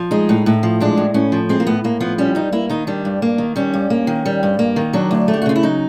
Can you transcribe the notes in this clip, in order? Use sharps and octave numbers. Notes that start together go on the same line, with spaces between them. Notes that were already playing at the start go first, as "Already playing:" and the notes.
Already playing: F3
G#3 D#4
A2
A2
F3
G#3 D4
A2
A2 C#4
F3
G#3 C4
A#3
A2 B3
A2 A#3
F3 B3
G3 C#4
G2 D#4
A#3 E4
D#3 D#4
G3 D4
G2
A#3
D#3
G3 C#4
G2
A#3
D#3
G3
G2
A#3
D#3
F#3 D4
D2
A3
G4
F#4
C#3 F4
E4
F#3 D#4